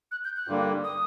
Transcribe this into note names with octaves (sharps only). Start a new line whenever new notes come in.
F#6
G6
F#6
G2 D3 G3 A#3
D#6